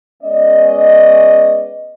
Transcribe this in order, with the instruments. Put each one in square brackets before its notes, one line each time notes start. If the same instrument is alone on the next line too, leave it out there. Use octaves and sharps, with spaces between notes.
[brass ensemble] G#3 B3 C#4 D5 D#5